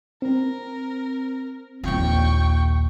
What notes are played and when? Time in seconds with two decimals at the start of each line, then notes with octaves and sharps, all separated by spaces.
0.22 C4 A#4
1.84 A#1 D#2 G5 C#6